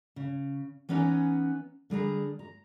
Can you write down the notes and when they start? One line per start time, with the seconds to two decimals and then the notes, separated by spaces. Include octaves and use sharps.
0.16 C#3
0.89 E3 B3 C#4 D#4 B4 A#5
1.90 D3 G3 G#4 A#5
2.39 A#5